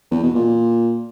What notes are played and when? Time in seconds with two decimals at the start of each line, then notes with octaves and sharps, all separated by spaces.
0.11 E2
0.23 B2
0.35 A#2